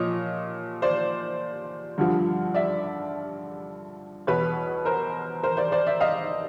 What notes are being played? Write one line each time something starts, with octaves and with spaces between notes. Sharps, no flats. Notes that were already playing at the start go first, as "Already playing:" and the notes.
Already playing: A#2 F3 C#5 D#5
C5 D5
G2 D3 F3
D5 E5
E2 B2 B4 C#5
A#4 C5
A#4 C5
C5 D5
C5 D5
D5 E5
D#5 F5